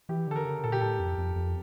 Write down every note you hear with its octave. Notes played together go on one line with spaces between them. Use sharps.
E3 G4
D3 A4
A#4
C#3
A#2 A4
G4
A2 A4
F2
F2
F2